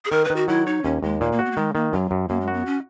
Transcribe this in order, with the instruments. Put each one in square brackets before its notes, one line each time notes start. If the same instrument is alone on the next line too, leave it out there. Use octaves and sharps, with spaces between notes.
[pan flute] G#4
[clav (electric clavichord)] D#3 [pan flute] A#4
[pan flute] B4
[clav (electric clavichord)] D#3
[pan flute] F#4
[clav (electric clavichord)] F#3 [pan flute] E4
[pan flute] D#4 [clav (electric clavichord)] C#5
[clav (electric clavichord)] D#2 [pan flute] C#4
[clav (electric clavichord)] D#2 [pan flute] G#3
[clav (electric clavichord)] A#2 [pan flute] A#3
[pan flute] A#3
[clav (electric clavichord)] F#4
[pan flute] B3
A#3
[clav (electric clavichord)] D#3 [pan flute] G#3
[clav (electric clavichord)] D#3 [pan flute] A#3
[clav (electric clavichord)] F#2 [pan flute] F#3
[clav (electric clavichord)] F#2
[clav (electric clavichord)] F#2 [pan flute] A#3
[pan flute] G#3
[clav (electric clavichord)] F#4
[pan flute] B3
C#4